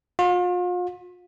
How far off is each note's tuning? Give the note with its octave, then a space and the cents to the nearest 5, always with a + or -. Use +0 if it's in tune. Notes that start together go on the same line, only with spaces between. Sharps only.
F4 +40